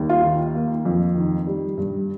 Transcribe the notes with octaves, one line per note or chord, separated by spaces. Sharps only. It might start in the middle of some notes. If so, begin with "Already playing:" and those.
Already playing: D#2 G3
F4
D#3
A#3
F2
D#3
G3
G2